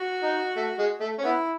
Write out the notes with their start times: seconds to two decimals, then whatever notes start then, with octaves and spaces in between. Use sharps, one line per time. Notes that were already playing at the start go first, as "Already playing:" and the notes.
Already playing: F#4
0.23 D#4
0.56 A3
0.79 G#3
1.00 A3
1.18 C#4
1.23 B3 E4